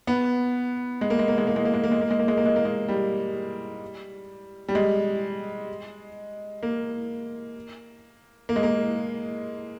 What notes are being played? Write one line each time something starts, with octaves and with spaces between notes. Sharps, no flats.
B3
G#3
A#3
G#3
A#3
G#3
A#3
G#3
A#3
G#3
A#3
G#3
A#3
G#3
A#3
G#3
A#3
G#3
A#3
G#3
G3
G3
G#3
A#3
A#3
G#3
A#3